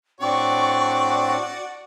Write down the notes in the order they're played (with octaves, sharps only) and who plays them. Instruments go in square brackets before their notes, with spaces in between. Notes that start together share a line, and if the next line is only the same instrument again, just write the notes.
[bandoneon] A2 C4 D4 [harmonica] F#4 D5 [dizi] C#6